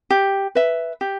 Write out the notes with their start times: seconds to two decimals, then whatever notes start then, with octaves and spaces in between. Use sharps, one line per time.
0.10 G4
0.55 B4 E5
1.01 G4